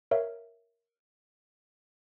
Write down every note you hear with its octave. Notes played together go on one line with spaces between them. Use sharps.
A#4 C#5 E5 F5